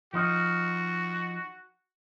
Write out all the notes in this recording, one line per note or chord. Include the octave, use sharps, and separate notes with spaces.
F3 D#4 F#4